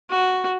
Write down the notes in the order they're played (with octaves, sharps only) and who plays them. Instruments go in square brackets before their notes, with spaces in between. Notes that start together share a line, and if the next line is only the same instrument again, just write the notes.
[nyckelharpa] F#4